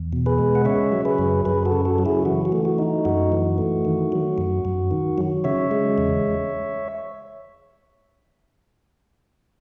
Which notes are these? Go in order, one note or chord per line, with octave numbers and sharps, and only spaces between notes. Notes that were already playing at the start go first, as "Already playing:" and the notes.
Already playing: E2
B2
G#4 B4
G#3
F#5
C#3 C#5 E5
F#3
G#4 B4
F#2
F#2 G#4 B4
F#4 A4
C#3
F#4 A4
F#3
E4 G#4
E3 F#4
F#4
A3
F#4
D#4
F#2 F#4
E3
A3
D#3
F#3
F#2
F#2
D#3
F#3
C#3 C#5 E5
G#3
E2